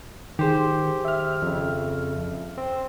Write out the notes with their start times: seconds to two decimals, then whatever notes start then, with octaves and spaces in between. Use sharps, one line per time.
0.39 D#3 G4 G#4 C5
1.05 E5 F6
1.42 F2 C#3
2.58 C4